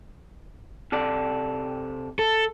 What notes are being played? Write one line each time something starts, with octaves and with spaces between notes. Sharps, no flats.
C3 A4 D5
A4